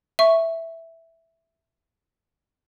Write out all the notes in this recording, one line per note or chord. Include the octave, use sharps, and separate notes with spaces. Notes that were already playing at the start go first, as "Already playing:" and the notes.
E5 C#6